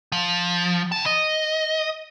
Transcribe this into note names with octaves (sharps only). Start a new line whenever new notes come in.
F3
C#3 A5
D#5